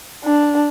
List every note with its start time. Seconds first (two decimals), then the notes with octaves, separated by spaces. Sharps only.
0.24 D4